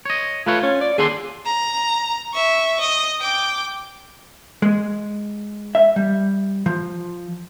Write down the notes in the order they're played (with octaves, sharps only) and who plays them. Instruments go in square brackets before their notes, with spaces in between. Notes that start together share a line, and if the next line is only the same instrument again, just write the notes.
[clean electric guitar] C#5 D#5
[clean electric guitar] A3 B4 C#5 [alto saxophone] F4
[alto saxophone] C#4 [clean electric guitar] F4
[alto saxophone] D5
[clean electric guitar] D#2 D3 C6 [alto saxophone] G#4
[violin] A#5
E5 C#6
D#5
G5 D6
[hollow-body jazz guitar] G#3
E5
G3
F3